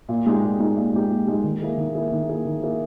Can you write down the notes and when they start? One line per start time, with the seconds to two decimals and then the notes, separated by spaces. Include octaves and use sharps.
0.09 A#2
0.26 G#3 D#4 G4
0.42 A#2
0.59 G#3 D#4 G4
0.76 A#2
0.94 G#3 D#4 G4
1.10 A#2
1.27 G#3 D#4 G4
1.44 D#3
1.61 A#3 E4 G#4
1.78 D#3
1.95 A#3 E4 G#4
2.12 D#3
2.29 A#3 E4 G#4
2.46 D#3
2.62 A#3 E4 G#4